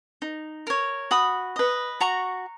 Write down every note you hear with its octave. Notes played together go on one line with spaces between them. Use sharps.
D#4
A#4 C#5
F#4 B5 D#6
B4 D#5
F#4 A#5 C#6